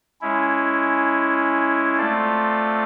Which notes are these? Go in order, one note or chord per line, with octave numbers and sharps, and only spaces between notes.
G#3 C#4 E4
A3 C4 F4 A4 D5